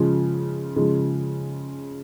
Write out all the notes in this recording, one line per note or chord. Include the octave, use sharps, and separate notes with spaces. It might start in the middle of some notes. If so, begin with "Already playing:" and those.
Already playing: C#3 F3 G#3
C#3 F3 G#3